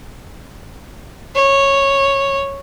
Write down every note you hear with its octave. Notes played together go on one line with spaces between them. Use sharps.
C#5